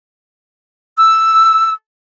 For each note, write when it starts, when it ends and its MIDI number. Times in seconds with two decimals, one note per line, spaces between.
0.97 1.71 88